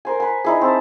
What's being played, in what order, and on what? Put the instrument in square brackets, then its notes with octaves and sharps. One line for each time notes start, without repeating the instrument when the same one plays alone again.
[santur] A#4 C5 G#5
B4 G#5
D#4 E4 G#4
C4 A5